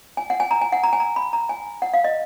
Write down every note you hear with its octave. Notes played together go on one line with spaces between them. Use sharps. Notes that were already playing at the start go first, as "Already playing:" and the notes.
G#5
F#5
G#5
A#5
G#5
F#5
A#5
G#5
A#5
B5
A#5
G#5
F#5
F5
D#5